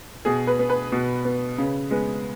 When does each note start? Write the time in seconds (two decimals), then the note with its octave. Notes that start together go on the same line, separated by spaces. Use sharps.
0.25 B2 G#4
0.47 B4
0.59 B3
0.70 B4
0.92 B2
1.25 B3
1.58 C#3
1.90 G#3 B3